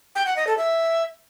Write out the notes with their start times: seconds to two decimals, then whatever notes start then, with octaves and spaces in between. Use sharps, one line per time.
0.15 G5
0.26 F#5
0.36 D#5
0.47 A4
0.58 E5